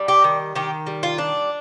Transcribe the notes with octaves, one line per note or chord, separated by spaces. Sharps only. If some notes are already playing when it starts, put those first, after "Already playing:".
Already playing: G3 D4
G4
D#3
D#3 G4
G3
F4
D4